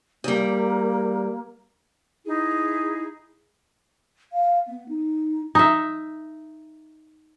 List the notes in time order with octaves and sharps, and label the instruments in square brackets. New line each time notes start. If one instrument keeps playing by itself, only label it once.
[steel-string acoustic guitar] E2 G3 [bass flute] A#3
[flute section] D#4 E4 G#4
[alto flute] F5
B3
D#4
[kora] D#4 E5